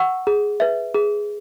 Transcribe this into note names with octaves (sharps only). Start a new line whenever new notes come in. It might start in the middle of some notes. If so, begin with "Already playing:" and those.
Already playing: F#5 C#6 E6
G#4
B4 E5
G#4